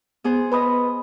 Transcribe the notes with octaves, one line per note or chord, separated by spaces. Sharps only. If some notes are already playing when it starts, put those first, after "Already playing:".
B3 G#4 C5
B4 C5 D#5 B5 D#6